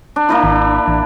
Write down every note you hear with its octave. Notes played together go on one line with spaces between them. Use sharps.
D4
A#3 D4 E4
G#1
A1